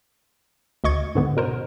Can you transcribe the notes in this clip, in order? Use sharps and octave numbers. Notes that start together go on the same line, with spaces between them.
D2 D#5 C#6 G#6
G#2 D3 B3
B2 A#4 C5